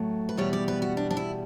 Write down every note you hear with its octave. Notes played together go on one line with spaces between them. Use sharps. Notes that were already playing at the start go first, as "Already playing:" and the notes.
Already playing: A2 F#3 A3
B4
E2 B2 G3 C#5
D5
B4
F#4
D4
D4
E4